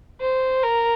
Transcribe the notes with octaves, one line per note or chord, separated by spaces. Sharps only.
C5
A#4